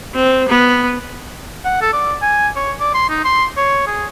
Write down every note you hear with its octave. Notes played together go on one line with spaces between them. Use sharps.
C4
B3
F#5
A4
D5
G#5
C#5
D5
C6
D#4
C6
C#5
G#4